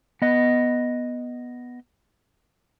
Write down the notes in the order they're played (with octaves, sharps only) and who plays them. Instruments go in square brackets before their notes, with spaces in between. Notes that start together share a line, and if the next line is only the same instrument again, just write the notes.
[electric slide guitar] B3 D#5